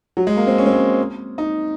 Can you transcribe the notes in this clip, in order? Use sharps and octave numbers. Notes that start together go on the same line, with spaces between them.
F#3
G#3
A#3
C4
C#4
C4
C#4
D#4